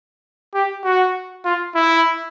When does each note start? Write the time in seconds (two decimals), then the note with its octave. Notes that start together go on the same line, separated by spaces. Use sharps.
0.54 G4
0.84 F#4
1.45 F4
1.75 E4